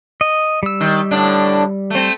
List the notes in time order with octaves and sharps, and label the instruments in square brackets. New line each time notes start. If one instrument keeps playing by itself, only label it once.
[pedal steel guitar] D#5
G3 E6
[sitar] D#3
A2 D3 D4
A3 C4